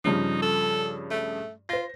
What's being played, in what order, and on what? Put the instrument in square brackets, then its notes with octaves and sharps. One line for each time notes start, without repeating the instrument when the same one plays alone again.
[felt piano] G2 C#3 F3 [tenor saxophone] D#4
[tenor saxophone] A4
A3
[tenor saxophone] F4 [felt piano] C5 A#6